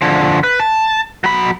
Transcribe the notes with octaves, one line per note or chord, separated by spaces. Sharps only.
D3 F3
B4
A5
F#3 B5